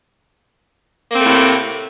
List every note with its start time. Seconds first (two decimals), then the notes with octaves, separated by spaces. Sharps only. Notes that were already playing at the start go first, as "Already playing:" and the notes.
1.11 A#3
1.16 C4
1.20 A3
1.24 A2
1.28 C3